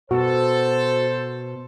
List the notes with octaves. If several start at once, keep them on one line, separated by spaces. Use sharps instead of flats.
B2 F#4 A4 C5